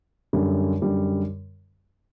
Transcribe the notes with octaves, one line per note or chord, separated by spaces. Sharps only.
F#2 D3 G3
F#2 D3 G3